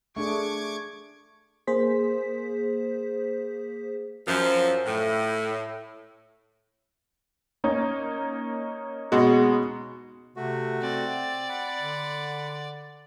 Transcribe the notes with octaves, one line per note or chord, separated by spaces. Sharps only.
A3 D4 G#4 C#6 D6 G#6
A#3 G#4 C5 B6
F#2 F3
A2
A#3 C#4 D#4
B2 G#3 F#4
C3 A3 F#4
C4 D5
F#5 B5
D3